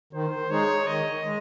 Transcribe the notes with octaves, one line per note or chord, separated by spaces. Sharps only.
D#3 C5
G#3 D#4 G#4 C#5
D#3 D#5
G#3